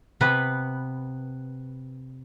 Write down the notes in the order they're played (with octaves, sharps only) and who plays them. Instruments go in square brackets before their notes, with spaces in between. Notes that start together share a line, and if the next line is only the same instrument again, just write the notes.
[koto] C3 B3 B4